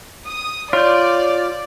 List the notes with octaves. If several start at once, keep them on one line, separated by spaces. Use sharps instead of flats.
D#6
F4 C#5 D5 G6